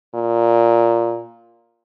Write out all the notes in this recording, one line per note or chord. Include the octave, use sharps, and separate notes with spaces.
A#2